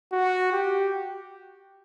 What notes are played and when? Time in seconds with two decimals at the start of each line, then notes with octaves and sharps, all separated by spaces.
0.12 F#4
0.52 G4